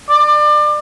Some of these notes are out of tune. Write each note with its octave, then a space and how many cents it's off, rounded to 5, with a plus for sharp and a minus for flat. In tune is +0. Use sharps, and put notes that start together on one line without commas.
D5 +30